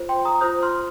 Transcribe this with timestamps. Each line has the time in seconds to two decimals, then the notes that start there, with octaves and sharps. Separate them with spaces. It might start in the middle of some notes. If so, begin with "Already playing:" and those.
Already playing: F4 C5
0.09 G5 C6
0.25 A#5 D#6
0.41 F4 C5 D#6 G6
0.63 C6 F6